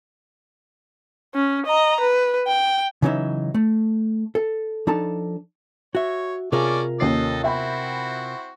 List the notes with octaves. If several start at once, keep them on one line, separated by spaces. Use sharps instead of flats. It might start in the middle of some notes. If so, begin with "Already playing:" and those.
C#4
D#5 A#5
B4
G5
C#3 E3 F#3 C#4 D#4 E5
A3
A4
F3 D4 D#4 A4 A5
F#4 C#5 E5
C3 C#4 D4 F4 G#4 A#4 D5
D#2 C#4 A4 D#5 C7
C4 E4 F#4 E5 G5 B5